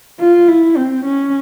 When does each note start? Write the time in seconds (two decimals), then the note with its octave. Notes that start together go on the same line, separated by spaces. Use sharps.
0.20 F4
0.48 E4
0.77 C4
1.05 C#4